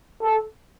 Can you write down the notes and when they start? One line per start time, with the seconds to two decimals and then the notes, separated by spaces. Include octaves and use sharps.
0.22 A4